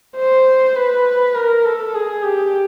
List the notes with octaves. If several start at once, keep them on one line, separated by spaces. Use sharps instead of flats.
C5
B4
A#4
A4
G#4
G4